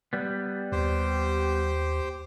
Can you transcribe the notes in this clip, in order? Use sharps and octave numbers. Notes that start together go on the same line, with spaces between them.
G3 B3
D#2 G4 C5